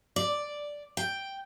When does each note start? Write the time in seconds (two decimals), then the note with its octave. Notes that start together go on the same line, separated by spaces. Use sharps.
0.16 D5
0.97 G5